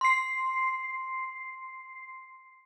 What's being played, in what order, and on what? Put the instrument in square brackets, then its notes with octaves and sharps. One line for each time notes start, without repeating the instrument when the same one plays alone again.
[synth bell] C6 C7